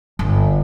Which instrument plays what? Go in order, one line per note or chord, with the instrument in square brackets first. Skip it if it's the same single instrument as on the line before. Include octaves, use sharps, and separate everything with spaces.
[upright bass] G1